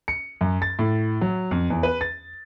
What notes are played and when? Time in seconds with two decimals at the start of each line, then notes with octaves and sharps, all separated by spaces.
0.08 C#7
0.41 F#2
0.62 A6
0.79 A2
1.21 F#3
1.51 F2
1.70 E2
1.83 B4
2.01 A6